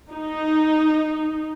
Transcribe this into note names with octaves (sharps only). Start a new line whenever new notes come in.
D#4